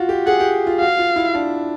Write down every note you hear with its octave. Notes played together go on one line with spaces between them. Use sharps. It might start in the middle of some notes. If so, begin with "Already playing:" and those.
Already playing: F4 F#4
G4
G#4 F#5
G4
F4
F#4 F5
F4
E4
D4